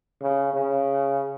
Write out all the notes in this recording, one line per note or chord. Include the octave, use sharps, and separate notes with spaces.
C#3
C#3